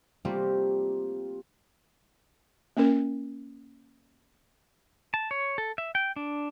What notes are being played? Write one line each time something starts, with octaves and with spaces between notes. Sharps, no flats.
G3 A3 A#3 C4 F4 G4
A#3 C#4 A#4
A5
C#5
A4
E5
G5
D4